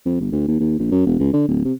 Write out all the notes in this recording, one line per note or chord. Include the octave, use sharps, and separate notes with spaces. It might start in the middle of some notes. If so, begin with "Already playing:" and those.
F2
G1
D2
D#2
D#2
A#1
F#2
E1
C#2
D3
D1
C3